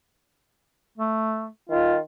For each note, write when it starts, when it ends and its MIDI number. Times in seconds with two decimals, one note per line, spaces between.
0.98 1.48 57
1.70 1.99 51
1.70 1.95 65